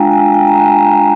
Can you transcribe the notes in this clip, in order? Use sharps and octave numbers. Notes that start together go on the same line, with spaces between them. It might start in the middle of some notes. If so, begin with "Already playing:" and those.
Already playing: G#3 D4 F4 F5 G5 G#5 A#5
G#5
G5
A#5
G#5
A#5